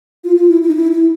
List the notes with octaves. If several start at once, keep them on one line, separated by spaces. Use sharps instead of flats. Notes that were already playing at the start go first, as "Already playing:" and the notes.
F4
F4
E4
E4
D#4
E4
E4